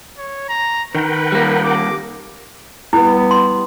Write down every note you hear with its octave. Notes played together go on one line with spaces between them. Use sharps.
C#5
A#5
D#3 A#4 B4 F#5 G5
G3 A#3
D6
G3 B3 E4
C6